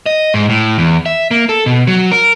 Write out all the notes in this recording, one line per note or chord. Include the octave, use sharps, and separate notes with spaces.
D#5
G#2
A2
E2
E5
A#3
A4
B2
F#3
A#4